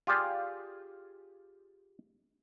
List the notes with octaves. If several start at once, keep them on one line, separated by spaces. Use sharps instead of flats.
F4 G4 G#4 D5 F5